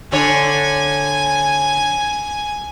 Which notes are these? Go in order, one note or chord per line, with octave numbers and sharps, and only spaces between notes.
D3 C#5 G#5